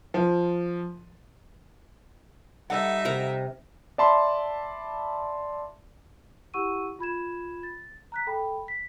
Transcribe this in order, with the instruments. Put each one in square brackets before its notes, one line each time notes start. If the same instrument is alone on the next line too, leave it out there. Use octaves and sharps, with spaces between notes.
[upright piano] F3
[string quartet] G3 D#4 E5 [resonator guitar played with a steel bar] A4 F#5
[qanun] C3 A#4 A#5
[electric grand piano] D5 E5 A5 B5 C6
[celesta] E4 G4 F#5 C#6 E6 D#7
F4 B5 G#6 E7
A6
A#5 F#6 B6
A4 G5 B5
B6